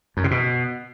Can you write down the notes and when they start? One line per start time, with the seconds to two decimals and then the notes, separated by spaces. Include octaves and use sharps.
0.17 F#2
0.24 C3
0.31 B2